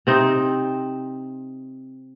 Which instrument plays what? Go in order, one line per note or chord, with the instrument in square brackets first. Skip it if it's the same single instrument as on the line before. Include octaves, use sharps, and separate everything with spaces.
[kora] C3 C4 D#4